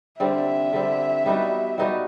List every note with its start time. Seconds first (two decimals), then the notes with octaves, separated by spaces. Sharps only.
0.20 D3 G3 C4 E5
0.73 D3 G3 C4
1.26 G3 B3 D#4 F#4
1.78 G3 B3 D#4 F#4